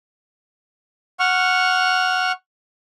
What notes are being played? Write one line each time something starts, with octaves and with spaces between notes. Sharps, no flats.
F#5 C#6 F6